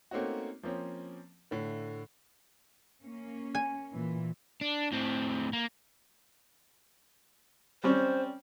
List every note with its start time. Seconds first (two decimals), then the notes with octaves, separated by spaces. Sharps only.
0.11 A3 A#3 C4 C#4 D#4 F#4
0.63 F3 A#3 C4 C#4
1.51 A2 D3
3.02 A#3 C#4
3.55 G#5
3.94 A#2 E3
4.61 D4
4.92 A2 C4
5.53 A#3
7.84 G3 C4 C#4 C5